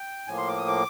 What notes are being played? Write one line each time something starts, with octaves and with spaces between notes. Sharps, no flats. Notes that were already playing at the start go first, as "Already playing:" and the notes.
Already playing: G5
A2 F3 A#3 G#5
C6
D6
D#6
D6